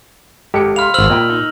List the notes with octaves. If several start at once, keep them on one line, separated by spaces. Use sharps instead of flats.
G#1 G#3 G4 A4 C#7
F5 B5 C6 F6 F7
G#1 C5 E6 F6 F#7
A#2 D#5 G5 B5
D#4